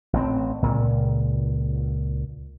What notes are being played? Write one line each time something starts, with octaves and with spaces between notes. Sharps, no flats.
A1 C4
C#2 A#2